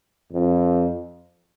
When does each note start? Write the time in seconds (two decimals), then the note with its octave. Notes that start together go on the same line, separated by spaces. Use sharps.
0.32 F2